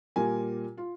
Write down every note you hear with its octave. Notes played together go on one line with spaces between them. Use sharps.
A#2 G3 F4 A#4 G#5
F4